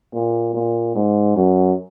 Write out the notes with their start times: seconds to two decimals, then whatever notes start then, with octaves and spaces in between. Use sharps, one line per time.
0.14 A#2
0.54 A#2
0.95 G#2
1.36 F#2